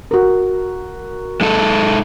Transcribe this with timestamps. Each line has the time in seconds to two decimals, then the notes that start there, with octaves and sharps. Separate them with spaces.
0.11 F#4 A#4
1.41 G#3 D#4 A4